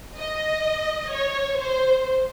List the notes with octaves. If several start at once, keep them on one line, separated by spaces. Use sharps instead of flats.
D#5
C#5
C5